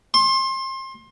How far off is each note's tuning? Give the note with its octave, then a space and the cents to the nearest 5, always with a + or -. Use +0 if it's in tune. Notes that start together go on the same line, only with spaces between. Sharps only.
C6 +30